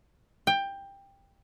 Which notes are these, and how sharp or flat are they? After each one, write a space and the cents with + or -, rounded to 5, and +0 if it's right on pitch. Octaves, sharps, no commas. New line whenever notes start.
G5 +15